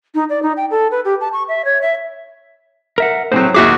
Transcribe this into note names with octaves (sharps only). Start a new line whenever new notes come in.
D#4
D5
D#4
G5
A4
B4
G4
A5
C#6
E5
C#5
E5
A#4 E5 F#5
A2 F#3 C4 C#4 C5
D#2 F#4 G#4 E5 D6